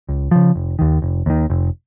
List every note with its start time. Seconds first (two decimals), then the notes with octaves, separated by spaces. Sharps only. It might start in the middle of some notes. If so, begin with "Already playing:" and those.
0.09 C#2
0.31 C#3 F3
0.55 F1
0.79 D#2 D#3
1.02 F1
1.26 D#2 D#3
1.50 F1